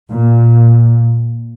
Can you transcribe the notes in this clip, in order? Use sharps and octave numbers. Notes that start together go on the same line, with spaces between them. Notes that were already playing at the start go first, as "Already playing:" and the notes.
A#2